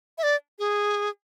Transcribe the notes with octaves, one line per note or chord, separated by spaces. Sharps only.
E5
D5
G#4